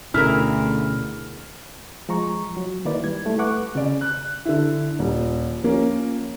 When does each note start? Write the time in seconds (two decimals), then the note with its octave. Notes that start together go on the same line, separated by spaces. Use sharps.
0.14 D2 B2 D3 C#4 E4 G#4 A#4 F6
2.09 F3 G#3 A#5 C#6
2.57 F#3
2.85 D#3 A#3 E4 B4 D5
3.04 G3 G#6
3.25 G3 A3 E4
3.38 A3 B4 F#5 C#6 D6 F#6
3.75 C#3 D5
4.01 F#6
4.45 D3 E4
4.99 D#1
5.62 F3 A#3 C#4